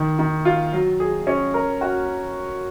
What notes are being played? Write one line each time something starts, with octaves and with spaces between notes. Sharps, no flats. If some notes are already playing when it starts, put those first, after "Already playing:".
Already playing: D#3
D#3
F4
F#3
G#4
C#4
A#4
F#4